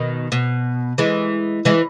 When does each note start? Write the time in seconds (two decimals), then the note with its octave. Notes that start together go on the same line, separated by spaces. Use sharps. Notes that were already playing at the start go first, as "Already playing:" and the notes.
Already playing: B2 D#3
0.32 B2
0.98 E3 G#3
1.65 E3 G#3